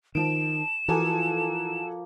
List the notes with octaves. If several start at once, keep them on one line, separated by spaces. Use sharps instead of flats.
D#3 F3 D7 E7
E3 F3 A#3 F#4 A4 G#5